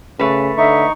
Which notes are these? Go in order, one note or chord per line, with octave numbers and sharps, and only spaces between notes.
C#3 A3 B4
D3 D#4 E5 C#6